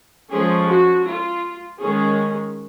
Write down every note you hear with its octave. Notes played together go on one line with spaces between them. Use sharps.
F3 G#3 C#4 G#4
F#4
F4
D#3 G#3 C#4 G#4